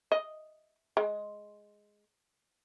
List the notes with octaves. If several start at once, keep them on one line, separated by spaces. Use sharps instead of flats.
D#5
G#3